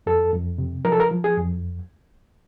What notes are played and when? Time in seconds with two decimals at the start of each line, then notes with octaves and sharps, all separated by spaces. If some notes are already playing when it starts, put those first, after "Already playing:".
0.06 F2 A4
0.33 F2
0.58 C3
0.85 F3 A#4
0.92 A4
1.00 A#4
1.11 F3
1.24 G#4
1.37 F2